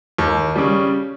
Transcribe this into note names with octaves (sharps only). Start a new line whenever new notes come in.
D#2
C#3 G3